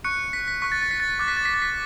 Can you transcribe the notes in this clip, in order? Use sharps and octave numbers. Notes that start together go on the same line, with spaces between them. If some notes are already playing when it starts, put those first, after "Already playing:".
C#6 F#6 C#7
B6
B6
C#6 F#6 B6
A6
A6
B6
A6
D6 F#6 A6
B6
A6
B6
A6
B6